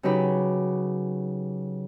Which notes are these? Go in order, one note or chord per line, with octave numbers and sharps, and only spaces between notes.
C#3 F#3 D#4 G4 B4